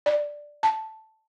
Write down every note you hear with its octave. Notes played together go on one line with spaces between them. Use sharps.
D5
A5